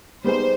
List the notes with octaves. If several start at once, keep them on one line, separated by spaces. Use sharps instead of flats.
G3 B3 D#4 G#4 C5